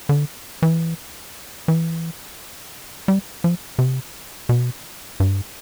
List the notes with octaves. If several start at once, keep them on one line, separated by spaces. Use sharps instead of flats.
D3
E3
E3
G3
F3
C3
B2
G2